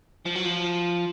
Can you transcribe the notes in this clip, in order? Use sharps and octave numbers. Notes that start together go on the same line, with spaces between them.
F3
F#3
F3